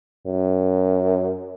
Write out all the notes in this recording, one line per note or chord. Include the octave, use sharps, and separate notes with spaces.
F#2